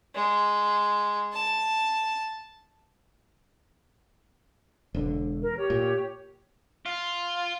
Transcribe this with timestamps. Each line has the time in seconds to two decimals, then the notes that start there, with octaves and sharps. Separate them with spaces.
0.15 G#3
1.33 A5
4.95 E1 D3
5.40 A#4
5.56 G4 C#5
5.70 A#2
6.86 F4